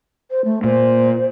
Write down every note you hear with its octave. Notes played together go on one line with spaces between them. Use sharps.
C5
A3
A#2 C5